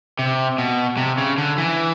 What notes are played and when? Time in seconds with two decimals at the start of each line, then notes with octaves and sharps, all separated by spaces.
0.19 C3
0.58 B2
0.97 C3
1.18 C#3
1.38 D3
1.58 E3